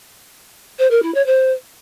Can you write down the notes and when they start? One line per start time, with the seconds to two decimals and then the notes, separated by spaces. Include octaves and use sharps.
0.79 C5
0.91 A#4
1.03 E4
1.14 C#5
1.26 C5